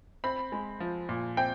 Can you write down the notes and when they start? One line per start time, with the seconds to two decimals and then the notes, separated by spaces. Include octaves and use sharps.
0.24 C4 B5
0.52 G#3
0.80 F3
1.09 A#2
1.37 C4 G5